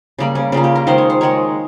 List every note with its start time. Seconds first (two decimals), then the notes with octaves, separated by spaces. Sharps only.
0.19 C#3 G3 A#3
0.35 C#4
0.52 C#3 G3 A#3 F4
0.64 G4
0.75 A#4
0.87 D#3 G#3 C5
0.98 C#5
1.10 C5
1.21 D#3 G#3 C#5